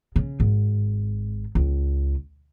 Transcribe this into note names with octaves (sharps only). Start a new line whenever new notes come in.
C#3
G#1
C#2